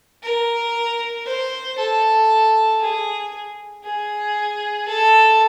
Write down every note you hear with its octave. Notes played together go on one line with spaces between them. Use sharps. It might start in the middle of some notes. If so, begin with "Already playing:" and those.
A#4
C5
A4
G#4
G#4
A4